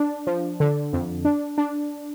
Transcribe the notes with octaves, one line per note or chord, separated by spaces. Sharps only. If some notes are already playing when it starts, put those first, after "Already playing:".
Already playing: D4
F3
D3
F2
D4
D4